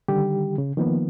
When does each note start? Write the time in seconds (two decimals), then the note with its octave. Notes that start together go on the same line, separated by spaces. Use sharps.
0.08 D3 D#3 G3 G4
0.58 C#3
0.77 D#3 F3 A#3 B3